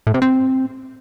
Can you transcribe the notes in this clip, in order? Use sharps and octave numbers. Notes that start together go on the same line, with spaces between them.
A2
C3
C4